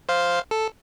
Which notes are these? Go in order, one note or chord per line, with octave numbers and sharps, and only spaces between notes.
C5 F5
A4